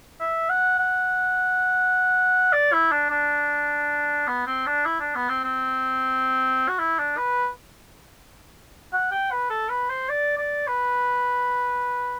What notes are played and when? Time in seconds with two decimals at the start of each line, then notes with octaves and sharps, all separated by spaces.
0.20 E5
0.49 F#5
0.79 F#5
2.53 D5
2.73 E4
2.92 D4
3.10 D4
4.27 B3
4.46 C4
4.66 D4
4.85 E4
5.00 D4
5.15 B3
5.29 C4
5.44 C4
6.68 F#4
6.79 E4
6.99 D4
7.17 B4
8.93 F#5
9.11 G5
9.31 B4
9.50 A4
9.69 B4
9.89 C5
10.09 D5
10.38 D5
10.67 B4